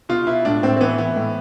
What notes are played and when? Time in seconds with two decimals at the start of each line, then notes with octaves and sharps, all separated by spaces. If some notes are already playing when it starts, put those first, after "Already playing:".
0.09 B2 F4
0.27 B2 E4
0.45 A2 D4
0.63 A2 C4
0.77 C4
0.80 E3 B3
0.98 E3 B3
1.16 A2